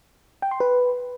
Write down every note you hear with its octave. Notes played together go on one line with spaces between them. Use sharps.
G5
C6
B4